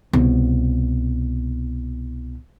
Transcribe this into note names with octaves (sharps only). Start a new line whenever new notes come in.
C2 B2